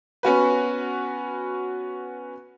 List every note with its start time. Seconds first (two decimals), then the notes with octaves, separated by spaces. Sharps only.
0.23 B3 C#4 F#4 B4